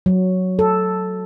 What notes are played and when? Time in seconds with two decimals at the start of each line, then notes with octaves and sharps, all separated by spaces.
0.06 F#3
0.59 A4